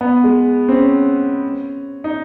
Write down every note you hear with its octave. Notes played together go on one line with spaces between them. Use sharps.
B3
G#3
C4
C#4
D#4